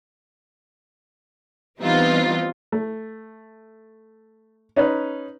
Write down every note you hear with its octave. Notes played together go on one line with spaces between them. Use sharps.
E3 G3 B3 C4 D#4 F4
A3
C#4 D#4 B4